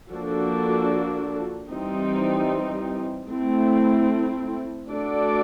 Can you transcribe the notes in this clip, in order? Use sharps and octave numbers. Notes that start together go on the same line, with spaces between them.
F3 A#3 D4 F#4 A4
E3 G3 C4 D#4
A3 C4 E4
A3 D4 F#4 A4 D5